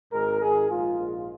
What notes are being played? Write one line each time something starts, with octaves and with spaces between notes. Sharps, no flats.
G#1 G#2 G#3 A#4
G#1 G#2 D#3 G#4
A#1 G#2 G#3 F4
A#1 G#2 G#3